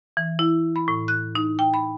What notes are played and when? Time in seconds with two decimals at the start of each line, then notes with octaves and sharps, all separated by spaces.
0.17 E3
0.39 E4
0.76 B5
0.88 A2
1.08 F#6
1.35 D#4
1.59 G5
1.74 B5